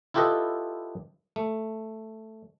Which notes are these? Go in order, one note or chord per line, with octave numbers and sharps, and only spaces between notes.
E4 F4 G4 A4 B4 D#5
A3